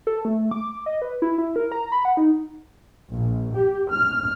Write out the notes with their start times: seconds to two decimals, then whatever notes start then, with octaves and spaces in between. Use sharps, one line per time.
0.07 A4
0.25 A3
0.51 D6
0.86 D#5
1.02 B4
1.22 E4
1.38 E4
1.56 A#4
1.72 A#5
1.92 B5
2.05 F#5
2.17 D#4
3.10 A#1
3.53 G4
3.90 F6